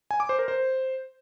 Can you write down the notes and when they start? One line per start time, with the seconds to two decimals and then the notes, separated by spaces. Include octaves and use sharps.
0.11 G#5
0.20 D6
0.29 C5
0.39 A#4
0.48 C5